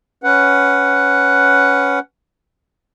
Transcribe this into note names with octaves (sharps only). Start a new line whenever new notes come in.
C#4 B4 F#5